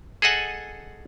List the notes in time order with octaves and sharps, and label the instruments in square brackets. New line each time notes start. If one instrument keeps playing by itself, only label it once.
[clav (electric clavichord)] G#4 A4 D#5 F#5 G#5